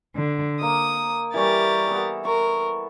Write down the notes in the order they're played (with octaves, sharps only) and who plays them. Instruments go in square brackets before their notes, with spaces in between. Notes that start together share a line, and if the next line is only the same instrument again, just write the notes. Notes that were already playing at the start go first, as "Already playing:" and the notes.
[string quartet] D3
[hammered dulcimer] A#3 A#4 D#5 [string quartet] D#6
[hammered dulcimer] E3 G3 C#6 [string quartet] G4 A#4 A6
[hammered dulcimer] B3 A4
[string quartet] A#4 [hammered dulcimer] C#6